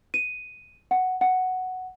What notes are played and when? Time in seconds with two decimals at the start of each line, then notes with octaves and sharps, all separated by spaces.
0.14 D#7
0.91 F#5
1.21 F#5